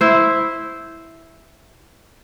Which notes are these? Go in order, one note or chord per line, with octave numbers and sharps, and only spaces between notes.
E4 C5